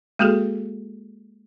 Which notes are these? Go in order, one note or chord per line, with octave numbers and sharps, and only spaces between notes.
G#3 A#3 F#4 G#4 A4